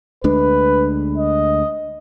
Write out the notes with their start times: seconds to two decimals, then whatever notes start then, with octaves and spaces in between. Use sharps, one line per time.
0.24 D2 G#3 D4 B4
1.18 D#5